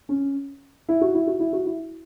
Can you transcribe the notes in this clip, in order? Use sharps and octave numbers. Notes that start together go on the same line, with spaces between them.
C#4
E4
F#4
E4
F#4
E4
F#4
E4